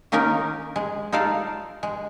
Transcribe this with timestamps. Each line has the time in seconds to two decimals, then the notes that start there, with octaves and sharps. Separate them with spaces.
0.12 D#3 A#3 C#4 D#4 A#4 D#5
0.76 G#3
1.12 D#4 F4 A4 D5 F5
1.83 G#3